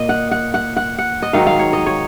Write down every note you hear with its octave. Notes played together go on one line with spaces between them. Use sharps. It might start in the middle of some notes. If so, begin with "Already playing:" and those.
Already playing: A#2 D#5
F#5
F#5
F#5
F#5
F#5
D#5
G#2 D#3 F#3 F5
F5
C#5
D#5
C#5